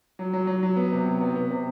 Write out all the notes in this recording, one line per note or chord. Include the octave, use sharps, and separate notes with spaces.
F#3
F#3
F#3
F#3
B3
C3
F#3
B3
B3
C3